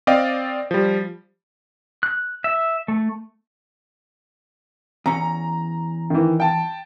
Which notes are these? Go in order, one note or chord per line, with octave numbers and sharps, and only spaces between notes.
C4 D5 D#5 F5 G5
F3 G3
F#6
E5
A3
E2 C#4 A#5
D#3 E3
G5 A5